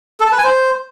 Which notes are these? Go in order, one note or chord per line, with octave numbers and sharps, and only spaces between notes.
A4
A5
B4
G#5
C5